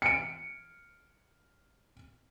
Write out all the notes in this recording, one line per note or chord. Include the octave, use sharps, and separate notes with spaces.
C#7 D7